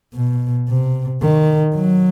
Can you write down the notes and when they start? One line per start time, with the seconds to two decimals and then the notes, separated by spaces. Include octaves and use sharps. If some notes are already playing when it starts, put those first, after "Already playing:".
0.15 B2
0.69 C3
1.22 D#3
1.75 F#3